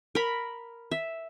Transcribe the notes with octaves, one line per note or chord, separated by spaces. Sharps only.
A#4 B5
E5